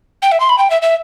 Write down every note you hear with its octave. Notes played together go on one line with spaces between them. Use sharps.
G5
E5
C6
B5
G5
E5
E5